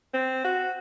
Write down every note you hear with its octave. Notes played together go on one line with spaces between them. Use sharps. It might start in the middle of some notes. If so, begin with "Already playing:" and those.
C4
F#4